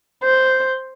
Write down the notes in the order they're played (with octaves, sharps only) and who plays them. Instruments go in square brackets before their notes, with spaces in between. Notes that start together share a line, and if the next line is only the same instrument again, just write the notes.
[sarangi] C5